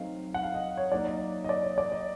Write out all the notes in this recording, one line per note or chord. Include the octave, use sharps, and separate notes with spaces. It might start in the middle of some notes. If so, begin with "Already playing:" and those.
Already playing: F#3 A3 C4 D#4 F5
F#5
F5
D#5
C#5
F#3 A#3 D#4 D5
D#5
D#5
D5
C#5
D5
D#5